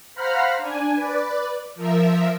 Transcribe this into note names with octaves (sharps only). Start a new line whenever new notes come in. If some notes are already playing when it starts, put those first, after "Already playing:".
C5 F5 F#5 A#5 B5 F6
D4 G#5
B4 D5
F3 A#4 E5